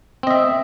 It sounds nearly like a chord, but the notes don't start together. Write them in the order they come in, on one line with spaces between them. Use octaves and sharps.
C4 D#5 E5